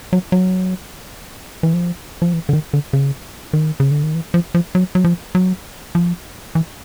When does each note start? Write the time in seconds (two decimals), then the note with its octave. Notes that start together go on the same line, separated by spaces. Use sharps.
0.13 F#3
0.32 F#3
1.63 E3
1.74 F3
2.22 F3
2.33 E3
2.49 D3
2.53 D#3
2.73 D3
2.93 C#3
3.53 D#3
3.80 C#3
3.91 D3
4.03 D#3
4.15 E3
4.34 F3
4.55 F3
4.75 F#3
4.95 F#3
5.04 F3
5.35 F#3
5.95 F3
6.55 E3